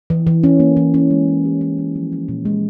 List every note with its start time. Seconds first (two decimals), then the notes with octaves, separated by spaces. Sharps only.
0.10 E3
0.27 E3
0.44 C#4
0.60 A#3
0.77 E3
0.94 C#4
1.10 G#3
1.28 G#3
1.45 G4
1.61 C#4
1.78 G#3
1.95 F3
2.12 C#4
2.29 A#2
2.45 G#3